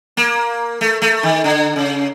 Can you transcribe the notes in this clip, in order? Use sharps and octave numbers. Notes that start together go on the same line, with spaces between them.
A#3
A3
A3
D#3
D3
C#3